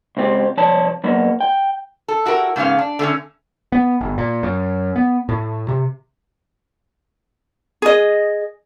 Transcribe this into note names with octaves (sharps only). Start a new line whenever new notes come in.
C#2 C4 G4
C2 F3 C#5 D5 A5
F#3 A#3 B3
G5
A4
E4 F#4 G4 A#4
G#2 C#3 B3 C#4 F5
D4
D3 A3 C4 C#4
B3
G1
A#2
F#2
B3
A2
C3
G#4 D#5